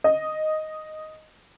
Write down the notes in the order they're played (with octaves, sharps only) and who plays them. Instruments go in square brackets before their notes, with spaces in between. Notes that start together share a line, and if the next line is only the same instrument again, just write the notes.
[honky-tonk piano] D#5